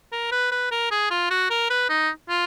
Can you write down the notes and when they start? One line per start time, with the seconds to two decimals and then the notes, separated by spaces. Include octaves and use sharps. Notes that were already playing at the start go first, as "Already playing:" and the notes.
0.12 A#4
0.31 B4
0.52 B4
0.71 A#4
0.91 G#4
1.10 F4
1.30 F#4
1.50 A#4
1.70 B4
1.89 D#4
2.29 F4